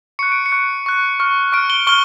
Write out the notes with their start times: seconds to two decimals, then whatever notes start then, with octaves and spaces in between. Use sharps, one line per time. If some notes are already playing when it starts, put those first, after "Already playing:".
0.19 C#6 F#6 C#7
0.32 D7
0.46 C#7
0.52 C#6 F#6
0.86 C#6 F#6
1.20 C#6 F6
1.53 C#6 F6 D7
1.70 G7
1.87 C#6 F6 G7